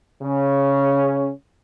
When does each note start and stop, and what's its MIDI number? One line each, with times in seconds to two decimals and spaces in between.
0.22 1.30 49
0.22 1.30 61